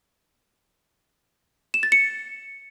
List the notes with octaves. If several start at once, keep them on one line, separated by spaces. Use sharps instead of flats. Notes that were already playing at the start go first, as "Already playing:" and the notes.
E7
A6
C#7